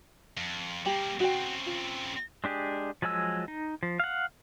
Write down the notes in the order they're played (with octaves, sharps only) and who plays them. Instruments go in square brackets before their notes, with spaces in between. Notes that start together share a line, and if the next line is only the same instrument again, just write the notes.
[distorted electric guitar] F2
[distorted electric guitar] G3 A#3 [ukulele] G4 G5
[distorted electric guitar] C#3 C4 [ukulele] F#4 G5
[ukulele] F4
[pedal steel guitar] G#3 D4 G4 G#4
F3 F#3 G#3 G#5 E6
D#4
F3
F5 F#5